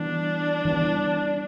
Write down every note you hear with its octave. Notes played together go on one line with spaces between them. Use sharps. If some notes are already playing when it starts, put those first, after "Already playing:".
Already playing: E3 G3 B3 D4
E3 G3 B3